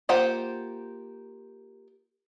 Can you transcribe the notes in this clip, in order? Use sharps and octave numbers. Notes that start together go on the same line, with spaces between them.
A#3 F4 G4 C5 F#5